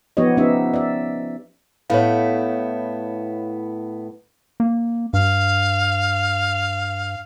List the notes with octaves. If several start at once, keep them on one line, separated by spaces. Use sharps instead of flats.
F3 B3 D#4 G4 C#5 D#5
B3 C#4 D#4 G4 E5
D5 E5
A2 B3 E4 C#5 F5
A#3
G2 F5